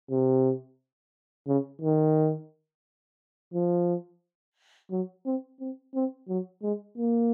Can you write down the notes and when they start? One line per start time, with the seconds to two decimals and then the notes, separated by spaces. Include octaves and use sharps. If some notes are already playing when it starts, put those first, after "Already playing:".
0.10 C3
1.47 C#3
1.82 D#3
3.54 F3
4.91 F#3
5.25 C4
5.60 C4
5.95 C4
6.28 F#3
6.63 G#3
6.97 A#3